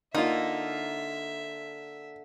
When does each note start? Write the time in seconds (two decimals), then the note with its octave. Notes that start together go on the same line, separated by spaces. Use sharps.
0.14 D3 A#3 D#4 F4 E5